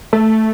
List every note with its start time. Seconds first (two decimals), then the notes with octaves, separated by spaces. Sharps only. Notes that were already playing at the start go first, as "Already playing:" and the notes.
0.13 A3